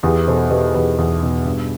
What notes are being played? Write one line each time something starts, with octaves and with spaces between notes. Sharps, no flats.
E2 G4 B4
B2 A4 C5
B2 G4 B4
E2 G4 B4
E2
B2
G2